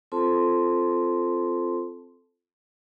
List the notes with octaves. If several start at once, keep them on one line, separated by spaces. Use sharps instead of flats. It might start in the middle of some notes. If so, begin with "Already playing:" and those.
C4 F4 A4 C5 A5 C6